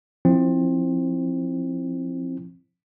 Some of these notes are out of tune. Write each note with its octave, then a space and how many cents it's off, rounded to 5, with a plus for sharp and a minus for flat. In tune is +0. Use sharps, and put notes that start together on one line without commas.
F3 +0 C4 +20 E4 +0